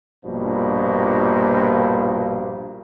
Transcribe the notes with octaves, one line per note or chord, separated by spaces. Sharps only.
A#1 G2 B2 F3 A#3